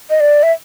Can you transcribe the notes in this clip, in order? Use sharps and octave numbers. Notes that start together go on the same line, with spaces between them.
D#5
D5
E5